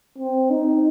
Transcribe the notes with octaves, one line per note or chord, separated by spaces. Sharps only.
C4
D#4